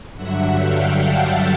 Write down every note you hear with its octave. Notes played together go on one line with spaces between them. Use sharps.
G2 D3 F#3 E5 F#5
F5 G5
G5 A5